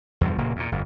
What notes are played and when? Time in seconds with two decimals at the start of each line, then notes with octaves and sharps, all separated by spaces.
0.21 E2 G2 B2 F3
0.38 F1 A#2 C#3 A#3
0.56 E2 A#2
0.72 G1 F2